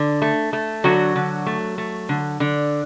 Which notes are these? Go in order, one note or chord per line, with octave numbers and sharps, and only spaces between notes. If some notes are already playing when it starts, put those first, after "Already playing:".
Already playing: D3
A3
A3
D3 F#3 F#4
D3
A3
A3
D3
D3